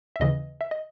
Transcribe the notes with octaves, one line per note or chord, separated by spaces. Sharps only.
E5
D#2 C#3 E3 D#5
E5
D#5